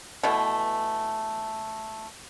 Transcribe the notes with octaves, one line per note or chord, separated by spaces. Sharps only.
B2 E3 A3